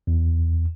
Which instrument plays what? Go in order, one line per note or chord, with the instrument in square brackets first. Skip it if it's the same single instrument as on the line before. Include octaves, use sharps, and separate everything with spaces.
[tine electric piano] E2